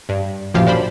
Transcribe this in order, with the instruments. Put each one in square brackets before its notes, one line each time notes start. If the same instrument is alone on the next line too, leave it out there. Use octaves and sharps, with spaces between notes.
[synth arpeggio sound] G2
A1 F#2 A#2 F3 G4 F5
F#2 D4 C5 B5